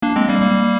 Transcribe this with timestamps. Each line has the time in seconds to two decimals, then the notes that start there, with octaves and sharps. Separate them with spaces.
0.02 A#3 D4
0.16 G#3 C4
0.28 G3 A#3
0.41 G3 A#3